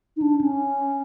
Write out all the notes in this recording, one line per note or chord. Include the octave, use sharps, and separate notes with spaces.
D#4
D4
C#4